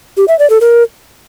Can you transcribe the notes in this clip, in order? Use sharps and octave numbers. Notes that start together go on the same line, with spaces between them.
G4
E5
D5
A4
A#4